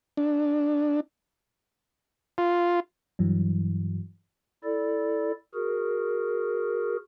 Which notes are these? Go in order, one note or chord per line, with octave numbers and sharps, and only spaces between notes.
D4
F4
G2 E3 F#3
E4 A4 D5
F#4 G#4 A#4